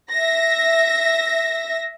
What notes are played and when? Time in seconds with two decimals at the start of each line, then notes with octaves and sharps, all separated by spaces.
0.11 E5 A#6